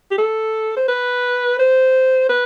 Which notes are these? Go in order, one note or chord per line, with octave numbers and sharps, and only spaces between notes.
G4
A4
C5
B4
C5
B4